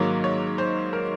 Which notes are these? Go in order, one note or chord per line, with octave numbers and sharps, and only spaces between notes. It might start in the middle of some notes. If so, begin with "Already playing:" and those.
Already playing: G#2 D#3 F#3 A#3 C#5
C#5
C5
A#4